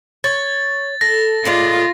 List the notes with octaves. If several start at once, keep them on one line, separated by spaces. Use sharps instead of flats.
C#5 A6
A4 A#6
A2 G#3 F4 D5